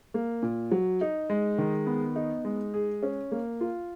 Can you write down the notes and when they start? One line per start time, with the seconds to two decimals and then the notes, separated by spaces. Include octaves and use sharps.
0.14 A#3
0.43 A#2
0.71 F#3
1.01 D#4
1.30 G#3
1.58 D#3
1.87 B3
2.16 D#4
2.45 G#3
2.74 G#4
3.03 C#4
3.32 A#3
3.61 F4